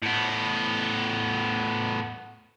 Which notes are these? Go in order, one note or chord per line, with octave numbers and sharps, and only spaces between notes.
A2 B3